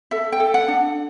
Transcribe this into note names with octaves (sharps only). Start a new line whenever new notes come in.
A4 E5
G5
A4
F#5
D4